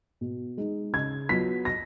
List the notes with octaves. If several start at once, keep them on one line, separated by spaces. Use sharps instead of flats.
B2
G#3 D#4
C#3 G#6
F#3 B3 F4 B6
A#6